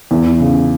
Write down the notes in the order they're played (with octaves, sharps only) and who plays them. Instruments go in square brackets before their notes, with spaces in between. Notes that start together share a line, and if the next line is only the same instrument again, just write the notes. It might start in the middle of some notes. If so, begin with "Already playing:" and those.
[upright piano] E2
C#3